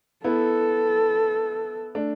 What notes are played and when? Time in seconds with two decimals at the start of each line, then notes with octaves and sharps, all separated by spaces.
0.24 B3 E4 A4
1.95 A3 D4